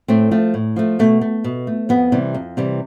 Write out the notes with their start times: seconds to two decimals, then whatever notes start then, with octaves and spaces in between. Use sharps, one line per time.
0.08 A2 A3 C4
0.31 F3 A3
0.54 A2
0.76 F3 A3
0.99 B2 A3
1.21 A3
1.44 B2
1.67 A3
1.89 F2 B3
2.12 C3 E3 G3
2.34 F2
2.57 C3 E3 G3